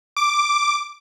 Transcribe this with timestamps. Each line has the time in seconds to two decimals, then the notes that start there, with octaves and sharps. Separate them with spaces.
0.17 D6